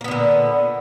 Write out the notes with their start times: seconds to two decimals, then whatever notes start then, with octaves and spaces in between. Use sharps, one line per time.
0.01 A#3
0.04 B3
0.08 D3
0.11 A#2